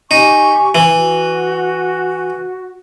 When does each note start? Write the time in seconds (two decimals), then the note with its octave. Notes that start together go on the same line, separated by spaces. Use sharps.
0.11 D#4 G4 G#5 C#6
0.75 E3
0.94 F#4